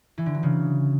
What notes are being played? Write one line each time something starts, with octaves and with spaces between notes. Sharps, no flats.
E3
D3
F#3
C#3